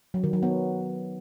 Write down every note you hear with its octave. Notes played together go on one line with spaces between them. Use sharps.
F#3
D#3
F#3
B3